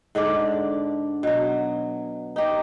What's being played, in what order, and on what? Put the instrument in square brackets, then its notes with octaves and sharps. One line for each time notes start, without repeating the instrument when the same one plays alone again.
[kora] G#2 D3 D4 D5
B2 F#3
D#4 G4 C#5